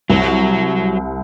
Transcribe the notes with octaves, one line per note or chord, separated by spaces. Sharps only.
C2 F#3